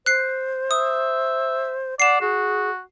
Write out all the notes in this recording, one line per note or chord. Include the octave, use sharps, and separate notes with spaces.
C5 F#6 C7
E5 D#6
D5 F#5 C7 E7
F#4 G#4